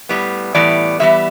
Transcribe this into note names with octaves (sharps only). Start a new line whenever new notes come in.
A2 G3 B3
A2 E3 G3 B3 D5
A2 E3 G3 B3 E5